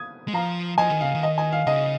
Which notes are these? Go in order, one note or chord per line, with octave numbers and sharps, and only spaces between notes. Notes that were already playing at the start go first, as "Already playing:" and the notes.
Already playing: D#6 G#6
G#3
F3 F5 A#5
F3 D#5 G#5
D#3
C#3 F5
D#3
D#5
D#5 G#5
F5
C#3 D#5